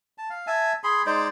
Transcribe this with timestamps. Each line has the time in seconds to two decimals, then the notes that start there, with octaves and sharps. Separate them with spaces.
0.18 A5
0.30 F5
0.47 E5 G#5 A5
0.84 G#4 B5 C6
1.06 G#3 D#4 C5 D5